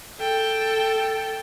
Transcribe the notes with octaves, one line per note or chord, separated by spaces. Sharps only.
A4 G5